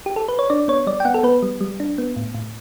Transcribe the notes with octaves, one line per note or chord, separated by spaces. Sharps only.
G4
A4
B4
C#5
D4 D5
B3 C#5
G3 D5
G5
B3 F#5
A4
B3 B4
G3
G3
D4
B3
A2
A2